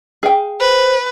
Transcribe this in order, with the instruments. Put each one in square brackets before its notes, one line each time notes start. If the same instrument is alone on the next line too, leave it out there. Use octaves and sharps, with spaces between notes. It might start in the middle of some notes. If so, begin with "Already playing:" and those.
[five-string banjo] G#4 F5 G5
[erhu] B4 [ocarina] C5